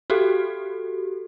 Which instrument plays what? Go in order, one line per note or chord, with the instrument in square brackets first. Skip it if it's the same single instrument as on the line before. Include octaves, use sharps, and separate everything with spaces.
[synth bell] F#4 G4 A4